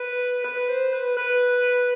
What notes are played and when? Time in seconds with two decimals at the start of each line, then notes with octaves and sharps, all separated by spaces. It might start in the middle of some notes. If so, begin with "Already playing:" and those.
Already playing: B4
0.44 B4
0.68 C5
0.92 B4
1.17 B4